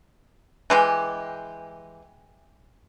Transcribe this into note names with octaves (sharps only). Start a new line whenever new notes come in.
E3 G#3 G4